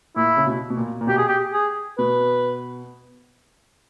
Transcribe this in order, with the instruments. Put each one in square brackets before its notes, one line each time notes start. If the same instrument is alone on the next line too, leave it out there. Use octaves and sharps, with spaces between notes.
[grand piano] A#2 [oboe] E4
[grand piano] C#3
B2
B2
A#2
A#2
[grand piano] B2 [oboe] G4
[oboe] G#4
G4
G#4
[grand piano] B2 [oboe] B4